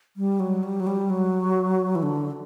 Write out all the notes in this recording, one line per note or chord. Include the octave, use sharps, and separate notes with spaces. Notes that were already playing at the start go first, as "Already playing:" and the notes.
G3
F#3
G3
F#3
G3
F#3
E3
D3